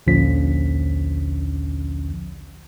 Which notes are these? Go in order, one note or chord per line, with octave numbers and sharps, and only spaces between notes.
A#1 D#2 D3 F3 C#4 B6